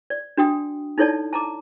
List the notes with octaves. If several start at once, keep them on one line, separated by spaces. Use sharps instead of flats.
D5
D4 F#4 G5 D#6
D#4 E4 A4 C#5 D5 A5
A5 A#5 D6